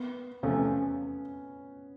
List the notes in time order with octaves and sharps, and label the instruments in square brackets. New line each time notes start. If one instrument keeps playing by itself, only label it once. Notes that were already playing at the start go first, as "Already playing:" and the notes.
Already playing: [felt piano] B3
[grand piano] E2 C3 F3 A3 [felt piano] C#4